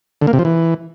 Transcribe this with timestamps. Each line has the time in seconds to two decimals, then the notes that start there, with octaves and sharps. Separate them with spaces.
0.22 D3
0.27 A#3
0.33 C3
0.39 F3
0.45 E3